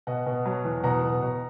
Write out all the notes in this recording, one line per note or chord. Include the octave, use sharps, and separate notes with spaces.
B2 D#5 F#5
B2
F#3
E2
B2 F#5 A#5
B2
B2